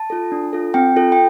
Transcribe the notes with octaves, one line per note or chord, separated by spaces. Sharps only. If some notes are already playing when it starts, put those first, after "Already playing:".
Already playing: A5
F4 A4
D4
F4 A4
C4 G5
F4 A4
G5